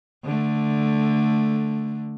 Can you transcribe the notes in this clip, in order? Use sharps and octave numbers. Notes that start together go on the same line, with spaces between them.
D3 A3